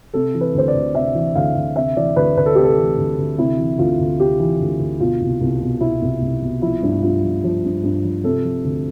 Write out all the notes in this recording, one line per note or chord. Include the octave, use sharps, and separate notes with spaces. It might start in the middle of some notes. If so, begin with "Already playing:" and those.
C3 A4
E3
B4
D2 C5
D5
D2
C3 E5
E3
D2 F5
D2
C3 E5
E3 D5
D2 B4
D2 B4
A4
C3 G4
A4
E3
D2
D2
C3 E4
E3
D2 F4
D2
C3 G4
E3
D2
D2
B2 F4
C2
C2
B2
B2 E4
C2
C2
B2
F3 E4
G2
G2 F4
F3
F3
G2
G2
F3
C3 A4
F3
D2